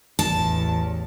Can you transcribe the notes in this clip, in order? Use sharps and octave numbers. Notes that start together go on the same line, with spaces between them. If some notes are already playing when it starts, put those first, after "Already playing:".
A1 E2 A5